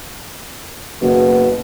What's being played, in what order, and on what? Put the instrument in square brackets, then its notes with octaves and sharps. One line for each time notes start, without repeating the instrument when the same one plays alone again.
[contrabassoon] F#1 [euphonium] B2